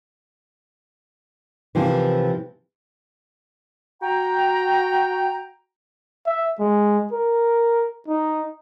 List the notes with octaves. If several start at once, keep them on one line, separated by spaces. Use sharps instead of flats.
C3 E3 F3 A#3 D#4 E4
F#4 G5 A#5
E5
G#3
A#4
D#4